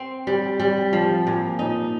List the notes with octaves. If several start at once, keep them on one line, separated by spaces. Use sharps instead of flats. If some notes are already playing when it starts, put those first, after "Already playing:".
Already playing: C4
G3
G3
F3
A#2
D#4